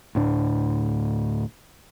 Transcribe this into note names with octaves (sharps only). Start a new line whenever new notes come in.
D2 A2 D4